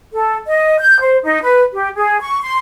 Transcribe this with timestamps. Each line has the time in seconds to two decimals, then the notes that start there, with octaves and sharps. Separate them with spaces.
0.13 A4
0.47 D#5
0.79 G6
1.00 C5
1.23 D#4
1.43 B4
1.73 G4
1.96 G#4
2.21 C#6
2.42 C6